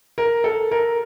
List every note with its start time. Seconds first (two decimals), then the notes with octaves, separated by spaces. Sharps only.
0.18 A#4
0.44 A4
0.71 A#4